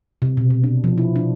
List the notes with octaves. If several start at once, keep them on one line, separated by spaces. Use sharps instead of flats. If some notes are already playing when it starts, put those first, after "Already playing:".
C3
B2
B2
D4
F3
E4
D4